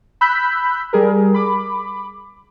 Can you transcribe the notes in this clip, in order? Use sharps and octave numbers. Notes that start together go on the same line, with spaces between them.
B5 E6 F#6 G6 B6
G3 G#4 A#4
B5 D6